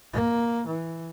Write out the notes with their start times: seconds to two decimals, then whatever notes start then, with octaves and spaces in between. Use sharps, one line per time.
0.13 A#3
0.67 E3